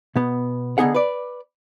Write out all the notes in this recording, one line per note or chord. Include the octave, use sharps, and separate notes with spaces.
B2 B3
D3 F3 B3 D#4 G#4 F#5
B4 D5